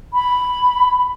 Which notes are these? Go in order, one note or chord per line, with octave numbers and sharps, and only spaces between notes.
B5